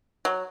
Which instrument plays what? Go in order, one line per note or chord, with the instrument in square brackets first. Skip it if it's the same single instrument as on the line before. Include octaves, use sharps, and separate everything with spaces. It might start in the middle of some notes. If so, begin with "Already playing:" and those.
[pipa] F#3